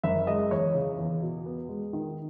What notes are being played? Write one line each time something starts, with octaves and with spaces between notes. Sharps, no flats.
F#1 E5
G#3 D#5
E2 C#5
C#3
E2
B2
B3
G#3
D#3